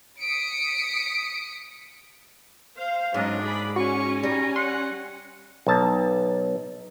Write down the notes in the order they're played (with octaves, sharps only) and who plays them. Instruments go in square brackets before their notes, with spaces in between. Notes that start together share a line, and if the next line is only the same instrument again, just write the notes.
[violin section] D#6 B6 C#7 D7
[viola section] C5 F5
[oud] G#2 [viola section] F#3 C#4 D#5 [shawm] D4
[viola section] G#4 D5 B5
[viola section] C#4 G#5 [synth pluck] F#4 [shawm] C#6
[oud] G3 [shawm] A#5
[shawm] F#5 [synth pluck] C6
[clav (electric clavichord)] B1 A5 A#5